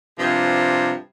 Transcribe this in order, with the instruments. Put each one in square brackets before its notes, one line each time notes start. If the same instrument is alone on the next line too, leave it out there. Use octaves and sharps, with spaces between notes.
[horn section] G2 C3 F3